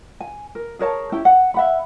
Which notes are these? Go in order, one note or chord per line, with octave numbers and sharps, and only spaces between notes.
G#5
A#4
G#4 A#4 C#5 A5
C#4 E4 G4 G5
F#5
E5 F#5 B5